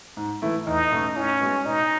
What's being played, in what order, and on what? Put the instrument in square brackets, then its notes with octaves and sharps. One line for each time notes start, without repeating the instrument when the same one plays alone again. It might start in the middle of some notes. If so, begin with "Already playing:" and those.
[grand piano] G#2
E3 A3 E4
[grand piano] E2 [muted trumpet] D#4
[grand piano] B2 A3 C#4
[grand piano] A2 [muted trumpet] C#4
[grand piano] G#3 B3 F#4
[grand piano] B2 [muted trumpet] D#4